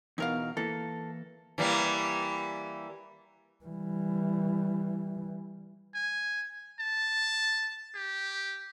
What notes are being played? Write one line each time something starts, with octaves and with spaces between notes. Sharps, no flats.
E2 B2 D#4 A#4 F5
E3 A#3 A4
E3 G3 A#3
E3 G3
G#5
A5
G4